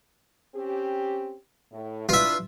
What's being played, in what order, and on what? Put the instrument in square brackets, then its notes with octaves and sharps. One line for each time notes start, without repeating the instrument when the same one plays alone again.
[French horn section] C4 C#4 G4
A2
[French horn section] D4 E4 B4 [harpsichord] F4 E5